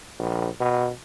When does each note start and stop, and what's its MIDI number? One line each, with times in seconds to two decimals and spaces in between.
0.19 0.48 34
0.60 0.91 47